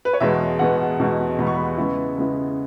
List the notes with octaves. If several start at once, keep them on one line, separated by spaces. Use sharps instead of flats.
B4
C#5
E2 B2 G#3 B3 E5
E2 B2 G#3 B3 F#5
E2 B2 G#3 B3
E2 B2 G#3 B3 B5
C#6
B5
C#3 G#3 B3 E4
C#3 G#3 B3 E4